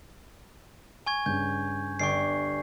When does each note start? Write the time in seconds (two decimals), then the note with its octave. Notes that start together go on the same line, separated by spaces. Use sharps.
1.06 G#5 C#6 G#6
1.26 G2 C#3 G6
1.99 G1 D5 G5 C#6 C7